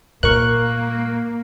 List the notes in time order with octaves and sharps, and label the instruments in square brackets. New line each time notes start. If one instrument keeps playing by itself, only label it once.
[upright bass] A#2 [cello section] A#3 [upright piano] A#4 [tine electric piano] C#6 F#6